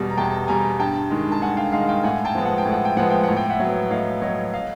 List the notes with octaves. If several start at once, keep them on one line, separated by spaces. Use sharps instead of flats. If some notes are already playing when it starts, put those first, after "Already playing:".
Already playing: E2 B2 G3 G#5
A#5
E2 G5 A5
B2 G3 G#5 A#5
G2 G5 A5
D#3 G#3
A5
G2 F#5 G#5
F5 G5
D#3 G#3 D#5 F5
F5 G5
A2 F#5 G#5
G5 A5
F3 G#3 B3
F#5
G5
A2
F#5
G5
F3 G#3 B3 F#5
G5
A2 F#5
G5
E5 F#5
F#3 B3
A2 D#5 F5
F#3 B3 C#5 D#5
D#5 F5